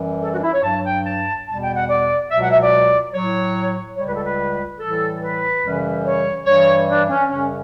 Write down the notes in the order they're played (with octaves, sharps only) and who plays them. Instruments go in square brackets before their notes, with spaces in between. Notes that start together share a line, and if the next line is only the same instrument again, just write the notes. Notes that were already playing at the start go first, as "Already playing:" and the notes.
Already playing: [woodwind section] F#2 E3 G3
A4
F#4
D4
E4
C#5
G2 F#3 A5
G5
A5
E2 B2 G3 A5
G5
F#5
D5
C#2 B2 F#3 E5
F#5
E5
D5
A2 F#3 C#5
C#2 C#3 G3 C#5
B4
A4
B4
A2 E3 G3 A4
B4
F#2 C#3 E3 G3
C#5
G2 E3 G3 C#5
D4
C#4
F#2 C#3 G3 C#4